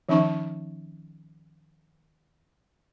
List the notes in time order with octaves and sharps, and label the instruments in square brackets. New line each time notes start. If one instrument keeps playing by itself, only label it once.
[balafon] D#3 F3 C#4 D#4 A5 C#6